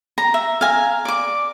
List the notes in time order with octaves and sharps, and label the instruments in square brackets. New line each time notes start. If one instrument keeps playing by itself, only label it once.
[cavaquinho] A#5
E5
F5 G#5 A#5
D5 D6